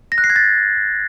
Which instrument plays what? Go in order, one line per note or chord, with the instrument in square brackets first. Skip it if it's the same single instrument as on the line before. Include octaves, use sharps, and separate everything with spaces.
[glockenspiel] A#6
F#6
C7
G#6
A6